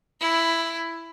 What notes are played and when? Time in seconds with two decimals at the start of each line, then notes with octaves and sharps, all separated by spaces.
0.21 E4